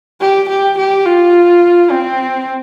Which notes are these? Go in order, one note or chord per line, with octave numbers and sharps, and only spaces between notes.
G4
G4
G4
F4
C4